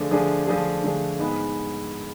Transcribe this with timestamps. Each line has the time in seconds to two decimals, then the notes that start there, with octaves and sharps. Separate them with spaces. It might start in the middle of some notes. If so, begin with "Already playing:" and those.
Already playing: D3 F3 A3 D4 G#4
0.11 D3 F3 A3 D4 G#4
0.47 D3 F3 A3 D4 G#4
0.83 D3 F3 A3 D4 G#4
1.19 G#2 G#3 B3